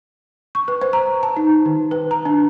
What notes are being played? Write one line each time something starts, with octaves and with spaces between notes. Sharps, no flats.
C#6
B4
C5
A#5
A5
D#4
D#3
B4
A#5
D4